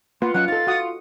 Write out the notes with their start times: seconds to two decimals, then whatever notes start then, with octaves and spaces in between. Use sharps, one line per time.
0.22 A#3 F4 B4 F#5 C6
0.34 F#3 C#4 D#5 F#5 F#6
0.48 D#4 A4 F5 A6
0.67 F#4 F#5 D#6